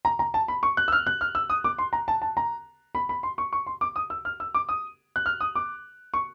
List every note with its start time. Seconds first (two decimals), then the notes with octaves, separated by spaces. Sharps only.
0.05 A#5
0.19 A#5
0.34 A5
0.48 B5
0.63 C#6
0.77 F#6
0.88 E6
0.92 F6
1.07 F#6
1.21 F6
1.35 E6
1.50 D#6
1.64 D6
1.78 C6
1.93 A#5
2.08 A5
2.22 A5
2.37 A#5
2.95 B5
3.09 B5
3.23 C6
3.38 C#6
3.53 C#6
3.67 C6
3.81 D6
3.96 D#6
4.10 E6
4.25 F6
4.40 E6
4.54 D6
4.69 D#6
5.16 F#6
5.26 F6
5.41 D#6
5.55 D6
6.14 C#6